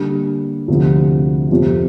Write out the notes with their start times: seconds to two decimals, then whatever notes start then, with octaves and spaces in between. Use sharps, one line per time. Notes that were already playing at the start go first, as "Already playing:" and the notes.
Already playing: D3 G3 A#3
0.68 D2 C3 F3
1.51 F2 C3 F3 C4